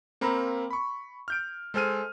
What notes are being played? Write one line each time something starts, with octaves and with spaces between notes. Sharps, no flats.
A#3 C4 A#4 B5
B5 C#6
F6 G6 D7
G#3 A4 C5 G#5 F6 D#7